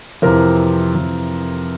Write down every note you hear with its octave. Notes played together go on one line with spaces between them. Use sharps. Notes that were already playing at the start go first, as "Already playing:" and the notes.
F2 C3 E3 A#4
F2 C3 E3